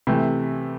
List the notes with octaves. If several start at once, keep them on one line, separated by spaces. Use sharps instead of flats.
C3 E3 A3